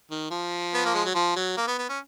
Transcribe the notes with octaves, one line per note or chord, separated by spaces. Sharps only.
D#3
F3
B3
A#3
G#3
F#3
F3
F#3
A#3
B3
B3
C#4